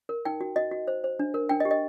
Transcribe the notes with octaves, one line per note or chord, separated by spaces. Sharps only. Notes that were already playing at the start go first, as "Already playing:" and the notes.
A#4
D#4 G5
F#4
F#4 D#5
F#4
C5
C5
D4
A#4
D4 G5
D#5
G4
D#5